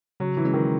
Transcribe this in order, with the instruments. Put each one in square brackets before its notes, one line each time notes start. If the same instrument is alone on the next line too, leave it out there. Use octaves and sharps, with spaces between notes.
[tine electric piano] C#3 [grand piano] F#3
[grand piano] E3
[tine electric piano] G#3 C#4 E4 G#4
[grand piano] D#3